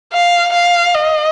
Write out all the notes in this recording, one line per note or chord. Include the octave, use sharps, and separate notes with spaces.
F5
F5
D#5